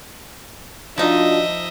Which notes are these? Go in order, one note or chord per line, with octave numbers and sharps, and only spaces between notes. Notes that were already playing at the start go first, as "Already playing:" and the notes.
F3 D4 D#4 F4 F#4 D#5 E5